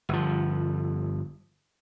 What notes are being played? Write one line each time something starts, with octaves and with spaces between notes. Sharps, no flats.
G1 F3